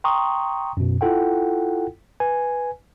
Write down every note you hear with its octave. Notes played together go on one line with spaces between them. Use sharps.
G5 A#5 C6 C#6 D#6
F#2 B2
E4 F4 A4 F#5 G5
B4 G#5